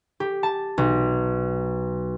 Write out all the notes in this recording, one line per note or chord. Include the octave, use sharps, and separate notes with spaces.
G4
A5
B1